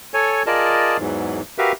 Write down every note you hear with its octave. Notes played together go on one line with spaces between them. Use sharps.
A4 C#5 G#5
F4 G#4 A#4 D5 D#5 A5
E2 G#2 E3 F#3
F#4 G4 A#4 B4 E5 F5